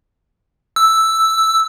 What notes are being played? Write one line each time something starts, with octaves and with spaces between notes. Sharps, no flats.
E6